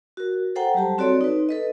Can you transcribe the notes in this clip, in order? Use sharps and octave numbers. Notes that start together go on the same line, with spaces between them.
F#4 A#4
A4 C5 F#5 G5 A#5
F#3 G3 G4 A5
C4 F#4 A4 C#5 D5 C6
D#4 B4
A4 B4 D#5